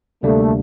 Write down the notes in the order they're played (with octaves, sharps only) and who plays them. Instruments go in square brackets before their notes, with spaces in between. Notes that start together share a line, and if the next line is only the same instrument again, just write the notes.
[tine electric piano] D2 C3 G3 A#3 D4 [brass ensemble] A3